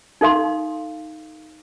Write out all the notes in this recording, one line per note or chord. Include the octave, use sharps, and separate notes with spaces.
D#4 A4 F5 C6